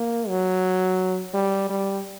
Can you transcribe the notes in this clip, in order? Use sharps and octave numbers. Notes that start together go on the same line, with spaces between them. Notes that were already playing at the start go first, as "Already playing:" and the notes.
Already playing: A#3
F#3
G3
G3